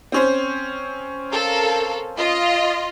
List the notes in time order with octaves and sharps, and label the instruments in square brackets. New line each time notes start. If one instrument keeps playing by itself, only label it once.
[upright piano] C4 C#4 C5
[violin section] A4 A#4 F5
F4 D#5